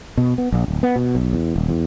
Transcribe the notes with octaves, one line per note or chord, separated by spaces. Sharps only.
B2
B3
A#1
D1
B3
B2
B1
E2
D#1
E2